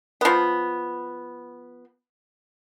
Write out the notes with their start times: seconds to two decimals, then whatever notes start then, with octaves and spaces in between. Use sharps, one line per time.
0.21 F3 B3